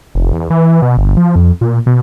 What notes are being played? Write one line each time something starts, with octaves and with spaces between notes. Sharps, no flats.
F1
E2
E3
B2
G1
F3
F2
A#2
B2